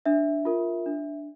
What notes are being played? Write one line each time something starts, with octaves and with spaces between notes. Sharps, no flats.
D4 E5
F4 A#4
D4